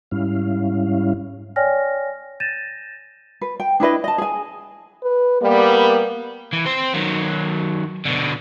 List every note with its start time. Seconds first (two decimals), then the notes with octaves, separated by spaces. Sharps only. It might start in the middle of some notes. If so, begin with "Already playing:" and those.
0.11 G#2 G3 C#4 E4 F5
1.56 C#5 D5 G5 G#5 F6 A#6
2.40 G6 A6 A#6 D#7 E7
3.41 B4
3.60 G5
3.80 D4 E4 B4 D#5
4.04 D#5 A5
4.18 G#4 G#5
5.03 B4
5.42 G3 A#3 B3
6.53 E3
6.66 C4 C5
6.94 D#3 F#3
8.05 B2 D3